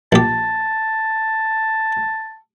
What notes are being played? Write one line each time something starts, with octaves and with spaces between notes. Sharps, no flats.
A#1 G4 A5